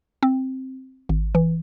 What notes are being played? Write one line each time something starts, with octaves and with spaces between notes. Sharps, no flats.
C4
G#1
E3